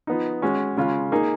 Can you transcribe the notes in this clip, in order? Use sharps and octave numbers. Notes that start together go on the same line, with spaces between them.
F3 B3 D#4
G#3 C#4 F#4
C#3 G#3 C#4 F4
A#3 D#4 G#4